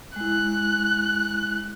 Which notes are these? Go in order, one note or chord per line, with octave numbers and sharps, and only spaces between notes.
G#3 E4 F#6